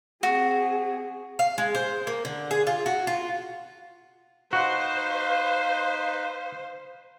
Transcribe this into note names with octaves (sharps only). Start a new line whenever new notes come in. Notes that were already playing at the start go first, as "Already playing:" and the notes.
C4 F#4 G#4
F5
G#3
C5
A#3
D3
G#4
F4
F#4
F4
D#4 F#4 B4 C5 F5